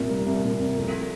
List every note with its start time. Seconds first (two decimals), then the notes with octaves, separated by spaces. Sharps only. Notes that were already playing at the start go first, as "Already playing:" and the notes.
Already playing: C2 A#2 A#4
0.11 G3
0.26 C2
0.43 A#2
0.59 C2
0.76 F2